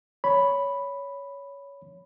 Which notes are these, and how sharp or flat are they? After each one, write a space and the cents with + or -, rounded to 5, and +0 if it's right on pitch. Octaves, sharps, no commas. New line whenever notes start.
C#5 +15 B5 +0